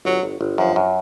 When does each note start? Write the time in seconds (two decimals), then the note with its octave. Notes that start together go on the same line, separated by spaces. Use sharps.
0.05 G1 F#3
0.23 G1
0.41 G1
0.58 F#2 F3
0.76 F#2